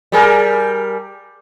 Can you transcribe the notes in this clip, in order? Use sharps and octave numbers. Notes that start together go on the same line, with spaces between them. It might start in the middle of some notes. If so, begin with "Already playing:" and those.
G3 G#4 A#4